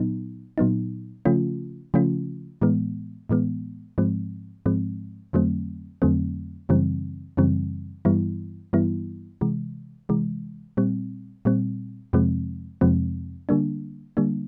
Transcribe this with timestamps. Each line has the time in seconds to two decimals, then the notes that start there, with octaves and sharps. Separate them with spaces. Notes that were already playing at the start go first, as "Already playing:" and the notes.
Already playing: A#2 F#3 B3 D#4
0.58 A#2 F#3 B3 D#4
1.25 C#3 F3 A3 C#4 F4
1.94 C#3 F3 A3 C#4 F4
2.61 A2 E3 G#3 B3
3.29 A2 E3 G#3 B3
3.98 G#2 F3 G#3 C4
4.66 G#2 F3 G#3 C4
5.33 F2 D3 F#3 A3 C4
6.02 F2 D3 F#3 A3 C4
6.69 F#2 C#3 E3 G3 C4
7.37 F#2 C#3 E3 G3 C4
8.05 G2 E3 G3 B3 E4
8.73 G2 E3 G3 B3 E4
9.41 C3 E3 G#3
10.09 C3 E3 G#3
10.77 A#2 G3 C4
11.45 A#2 G3 C4
12.13 F2 C3 F3 G#3 C4
12.81 F2 C3 F3 G#3 C4
13.49 D3 G3 A#3 D4
14.17 D3 G3 A#3 D4